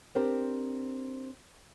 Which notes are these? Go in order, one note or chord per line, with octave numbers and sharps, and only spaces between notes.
C4 D4 G4 A#4 C5